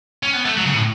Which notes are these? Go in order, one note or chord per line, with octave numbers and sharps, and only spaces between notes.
C#4
B3
A3
F#3
C#3
A2